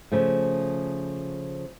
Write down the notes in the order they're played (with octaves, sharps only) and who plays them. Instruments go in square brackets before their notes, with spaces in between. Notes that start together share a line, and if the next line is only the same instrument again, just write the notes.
[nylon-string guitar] C#3 F3 A3